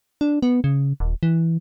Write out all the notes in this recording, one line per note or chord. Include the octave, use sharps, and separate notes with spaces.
D4
B3
C#3
D#1
E3